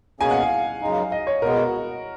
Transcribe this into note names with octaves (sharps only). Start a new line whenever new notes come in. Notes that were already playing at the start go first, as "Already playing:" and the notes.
B2 A#3 C#4 G#4 G#5
F#5
F5
F#2 C#3 G#3 D#4
D#5
C#5
B2 G#3 B3 A#4
F#4